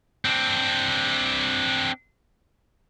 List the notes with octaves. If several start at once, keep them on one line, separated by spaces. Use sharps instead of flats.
C4 D4